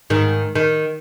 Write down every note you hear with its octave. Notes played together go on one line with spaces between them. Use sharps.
G#2 D#3
D#3